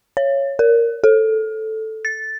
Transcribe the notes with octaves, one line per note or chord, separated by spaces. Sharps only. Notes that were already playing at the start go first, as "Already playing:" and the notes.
C#5
A#4
A4
A6